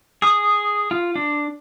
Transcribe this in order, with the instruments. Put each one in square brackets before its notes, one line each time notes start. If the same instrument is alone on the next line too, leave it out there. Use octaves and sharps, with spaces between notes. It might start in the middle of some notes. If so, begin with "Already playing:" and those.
[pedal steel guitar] G#4 D#6
F4
D4